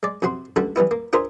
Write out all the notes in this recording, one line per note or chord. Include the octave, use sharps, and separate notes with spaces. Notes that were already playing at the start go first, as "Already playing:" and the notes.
G#3 D5
F2 C3 F#4 C6
C#2 D3 G3 A3 F#4
E3 G3 B3 E4
A#3
D4 F4 G#4 A#4 C5 E5